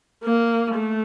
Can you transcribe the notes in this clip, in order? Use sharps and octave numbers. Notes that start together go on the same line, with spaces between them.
A#3
A3